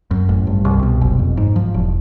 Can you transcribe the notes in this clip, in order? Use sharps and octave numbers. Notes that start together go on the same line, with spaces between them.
F#2
A1
G2
C2
B2
F#1
F2
G#2
F3
E1